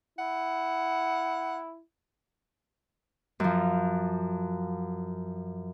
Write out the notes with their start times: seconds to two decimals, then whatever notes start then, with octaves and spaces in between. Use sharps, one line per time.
0.19 E4 F#5
3.40 F#2 F3